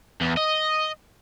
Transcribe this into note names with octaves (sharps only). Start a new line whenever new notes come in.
E2
D#5